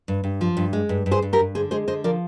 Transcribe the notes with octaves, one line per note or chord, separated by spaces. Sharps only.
G2
G2
F3
G2
G#3
G2
G2
G#4 C5
G2
G4 A#4
G2
D3 G#4 C5
G#3 G#4 C5
D3 C5 D#5
F3 A#4 D5